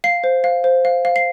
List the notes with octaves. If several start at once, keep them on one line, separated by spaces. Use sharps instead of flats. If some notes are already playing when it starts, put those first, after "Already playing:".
F5 C7
C5
F5
C5
F5
F5
C7